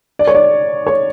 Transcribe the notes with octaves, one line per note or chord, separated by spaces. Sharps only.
D5
C#5
D5
C#5